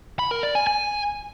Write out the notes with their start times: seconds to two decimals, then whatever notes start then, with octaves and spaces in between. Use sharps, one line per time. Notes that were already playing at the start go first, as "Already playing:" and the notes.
0.19 B5
0.31 A#4
0.43 D5
0.55 G#5
0.67 G#5